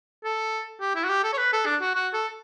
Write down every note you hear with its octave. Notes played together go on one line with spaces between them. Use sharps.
A4
G4
E4
F#4
G4
A4
C#5
B4
A4
D4
F#4
F#4
A4